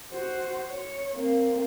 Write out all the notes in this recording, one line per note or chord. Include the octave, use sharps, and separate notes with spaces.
F#4 C5
C#5
A#3 C4